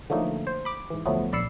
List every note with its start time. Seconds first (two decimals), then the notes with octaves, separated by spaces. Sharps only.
0.10 D3 F3 F#3 A3 A#3 D#4
0.47 C5
0.65 B5 D6
0.90 G#2 E3
1.06 D2 F3 F#3 A3 B3
1.32 A#1 D5 B5 E6 C7 C#7